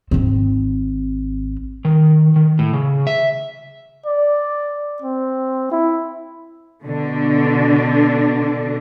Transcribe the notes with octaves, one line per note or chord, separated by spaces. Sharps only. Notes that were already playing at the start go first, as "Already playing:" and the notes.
G#1 C4
D#3
D#3
A2
C#3
E5
D5
C4
E4
B2 D3 D4